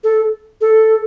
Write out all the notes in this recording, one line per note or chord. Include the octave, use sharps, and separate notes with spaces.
A4
A4